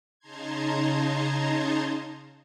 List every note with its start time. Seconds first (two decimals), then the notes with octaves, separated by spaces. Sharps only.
0.19 C#3 D#4 A5 A#5 C6 G#6